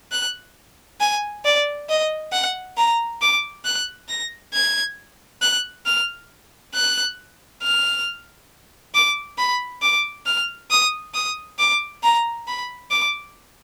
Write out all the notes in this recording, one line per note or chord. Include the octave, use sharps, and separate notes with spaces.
F#6
G#5
D5
D#5
F#5
A#5
D6
F#6
A#6
G#6
F#6
F6
F#6
F6
D6
B5
D6
F6
D#6
D#6
D6
A#5
B5
D6